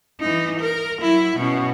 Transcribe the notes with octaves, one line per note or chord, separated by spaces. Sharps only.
E3 D#4
A#4
F#3 E4
B2 C#4